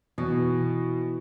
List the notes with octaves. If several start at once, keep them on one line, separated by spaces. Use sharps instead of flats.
B2 E3